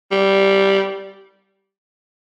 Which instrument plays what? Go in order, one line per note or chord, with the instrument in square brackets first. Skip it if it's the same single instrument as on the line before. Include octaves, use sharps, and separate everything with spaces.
[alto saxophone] G3